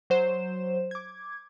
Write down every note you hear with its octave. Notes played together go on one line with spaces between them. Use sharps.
F#3 C5 E7
D6 G#6